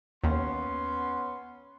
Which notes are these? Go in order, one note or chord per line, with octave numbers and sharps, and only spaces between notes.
D#2 B3 C#4 C6